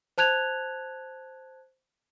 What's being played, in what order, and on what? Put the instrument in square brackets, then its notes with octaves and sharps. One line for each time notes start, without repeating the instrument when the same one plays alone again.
[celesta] C5 A5 F#6 G#6 F7